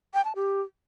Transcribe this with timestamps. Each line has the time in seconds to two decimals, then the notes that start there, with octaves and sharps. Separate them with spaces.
0.14 G5
0.25 A5
0.35 G4